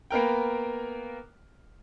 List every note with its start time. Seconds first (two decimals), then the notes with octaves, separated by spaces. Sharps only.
0.11 A#3 B3 A#4 G5